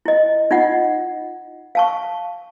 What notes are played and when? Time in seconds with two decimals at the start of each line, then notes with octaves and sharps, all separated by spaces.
0.05 E4 D#5
0.51 D#4 F4 D#5 F#5
1.75 F5 A5 C#6